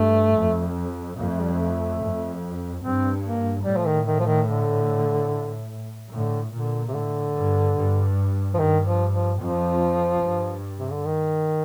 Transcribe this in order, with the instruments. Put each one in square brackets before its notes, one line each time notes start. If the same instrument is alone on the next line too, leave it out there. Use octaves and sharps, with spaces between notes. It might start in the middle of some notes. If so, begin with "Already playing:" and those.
Already playing: [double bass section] G2 [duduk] A3
[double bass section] F2
[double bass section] F2 [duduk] A#3
[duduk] A3
G3
A3
[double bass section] F2
[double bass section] G2 [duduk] C4
[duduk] A#3
[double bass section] A2 [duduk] G3
[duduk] F3
D#3
D#3
F3
D#3
D3
[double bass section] A2 [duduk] D3
[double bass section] A#2 [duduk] D3
[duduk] C3
[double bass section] A2 [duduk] D3
[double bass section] G2
G2
[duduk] F3
[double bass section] G2 [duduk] D#3
[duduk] F3
F3
[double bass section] F2 [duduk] F3
[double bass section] G2
[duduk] C3
D3
D#3